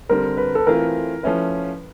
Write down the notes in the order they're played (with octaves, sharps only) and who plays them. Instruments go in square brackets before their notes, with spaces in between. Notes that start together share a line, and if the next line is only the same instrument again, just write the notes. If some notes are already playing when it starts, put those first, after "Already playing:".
[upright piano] D3 G3 C4 [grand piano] A#4
[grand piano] B4
A4
[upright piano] E3 A3 C4 F4 [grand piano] A#4
[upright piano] F3 A3 C#4 E4 [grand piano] B4